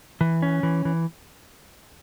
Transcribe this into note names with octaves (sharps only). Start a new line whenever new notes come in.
E3
C#4
E3
E3